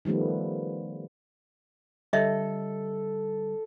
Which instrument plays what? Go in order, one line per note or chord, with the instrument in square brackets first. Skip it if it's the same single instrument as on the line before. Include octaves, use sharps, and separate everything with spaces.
[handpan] D#3 F3 G3 A3 B3
[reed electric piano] D3 G3 [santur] A4 [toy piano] C#5 D#5 E5